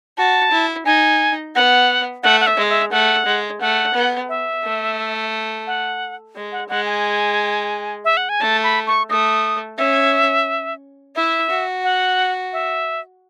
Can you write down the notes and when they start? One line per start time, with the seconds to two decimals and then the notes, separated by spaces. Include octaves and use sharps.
0.18 F#4 A5
0.52 E4
0.85 D#4 G#5
1.55 B3 F#5
2.23 A3 F#5
2.40 F#5
2.47 E5
2.57 G#3
2.69 E5
2.91 A3 F#5
3.26 G#3
3.61 A3 F#5
3.94 B3
4.29 E5
4.64 A3
5.67 F#5
6.36 G#3
6.52 F#5
6.69 G#3 F#5
6.86 G#5
8.05 E5
8.17 F#5
8.29 G#5
8.41 A3 A5
8.64 B5
8.87 C#6
9.10 A3 D#6
9.78 C#4 E5
11.16 E4 E5
11.50 F#4
11.84 F#5
12.53 E5